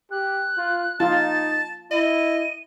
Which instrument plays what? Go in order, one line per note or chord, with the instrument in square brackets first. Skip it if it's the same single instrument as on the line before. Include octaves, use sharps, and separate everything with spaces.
[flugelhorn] G4 [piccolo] F#6
[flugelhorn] F4
[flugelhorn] D#4 [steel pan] F4 [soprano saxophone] A5 [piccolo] A6
[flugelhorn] E4 [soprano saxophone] D#5 [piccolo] D#7